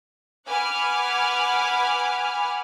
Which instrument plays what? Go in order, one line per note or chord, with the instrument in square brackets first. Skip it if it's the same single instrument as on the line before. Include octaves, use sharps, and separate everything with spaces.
[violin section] B4 F#5 G#5 B5 D6 F6